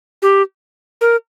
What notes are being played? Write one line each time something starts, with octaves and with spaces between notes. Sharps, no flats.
G4
A#4